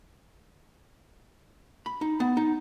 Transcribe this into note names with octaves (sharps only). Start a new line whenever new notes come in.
B5
D#4
B3
D#4